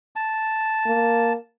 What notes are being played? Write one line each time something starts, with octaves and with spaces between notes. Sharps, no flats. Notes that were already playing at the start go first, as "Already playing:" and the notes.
A5
A#3